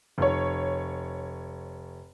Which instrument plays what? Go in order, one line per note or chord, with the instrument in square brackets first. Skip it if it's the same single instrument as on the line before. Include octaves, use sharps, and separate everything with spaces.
[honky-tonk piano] F1 C#5